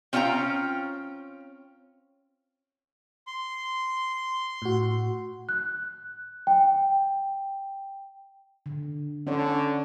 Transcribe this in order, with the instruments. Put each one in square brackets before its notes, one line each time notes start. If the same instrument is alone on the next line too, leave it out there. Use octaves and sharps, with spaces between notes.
[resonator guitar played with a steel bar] C4 C#4 F4 D#5 G5 A#5
[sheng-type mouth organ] C6
[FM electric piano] A2 F#4
[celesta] F#6
G5
[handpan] D3
[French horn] D3 [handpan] C#4 A4 C#5